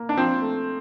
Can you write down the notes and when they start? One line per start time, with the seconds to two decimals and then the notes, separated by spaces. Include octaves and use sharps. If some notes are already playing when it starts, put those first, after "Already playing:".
Already playing: A#3
0.09 D4
0.17 F3 C4
0.42 A3